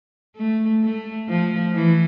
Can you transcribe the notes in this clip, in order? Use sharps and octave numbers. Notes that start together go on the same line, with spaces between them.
A3
A3
F3
E3